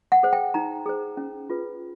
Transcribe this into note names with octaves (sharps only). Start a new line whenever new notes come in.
F#5
G#4 C5
G5
D#4 A#5
G#4 C5
C#4
F4 G#4 B4